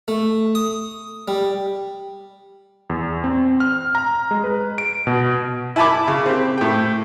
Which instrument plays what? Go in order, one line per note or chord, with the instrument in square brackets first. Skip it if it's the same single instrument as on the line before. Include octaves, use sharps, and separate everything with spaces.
[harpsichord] A3
D#6
G3
[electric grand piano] E2
C4
F6
A#5
G#3
B4
D7
B2
[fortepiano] E4 G#5 A5 B5 D6
C#3
C4 G4
A2 G5